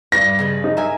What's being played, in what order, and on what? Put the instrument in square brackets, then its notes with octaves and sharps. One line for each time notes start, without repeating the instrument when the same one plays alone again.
[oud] G2 [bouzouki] B4 D5 [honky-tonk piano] A#6
[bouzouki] C#3 G#3 B4
[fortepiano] D#4
[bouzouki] A#4 G#5 [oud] E5